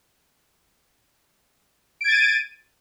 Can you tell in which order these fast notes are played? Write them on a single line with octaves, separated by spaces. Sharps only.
D7 G#6 A6 D#7